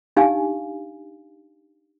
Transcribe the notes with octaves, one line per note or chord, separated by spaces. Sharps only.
D4 D#4 G4 F5 G#5